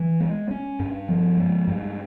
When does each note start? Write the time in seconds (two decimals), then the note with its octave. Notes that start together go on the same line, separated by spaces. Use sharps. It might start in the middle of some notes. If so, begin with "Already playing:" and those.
Already playing: E3
0.20 G#3
0.51 C#4
0.79 G2
1.09 F3
1.37 G#3
1.67 G2